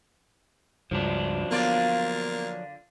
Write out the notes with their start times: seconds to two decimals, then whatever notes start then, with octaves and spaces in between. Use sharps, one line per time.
0.91 C#2 G2 F3 F#3 D4
1.51 D3 A#3 B3 F4 D5